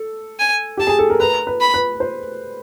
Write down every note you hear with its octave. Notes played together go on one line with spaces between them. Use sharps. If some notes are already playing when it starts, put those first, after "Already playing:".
Already playing: A4
G#5
G4 A5
G#4
A4
A#4
B4 A#5
B4
B5
B4
C5